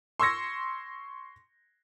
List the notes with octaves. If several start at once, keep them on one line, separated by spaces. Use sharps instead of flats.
C6 C#6 E6 G#6 A#6 C#7